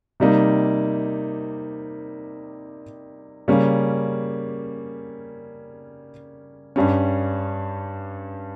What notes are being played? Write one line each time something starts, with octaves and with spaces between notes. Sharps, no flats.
C3 G3 A#3 D#4
C#3 G3 A#3 C#4
G2 G3 C#4